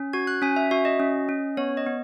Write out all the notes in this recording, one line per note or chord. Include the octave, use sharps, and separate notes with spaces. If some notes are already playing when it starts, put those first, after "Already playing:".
Already playing: C#4
F#4 G#6
F#6
C#4 G#5
E5
F#4 E5
D#5
C#4
C#4
B3 C#5
D#5
B3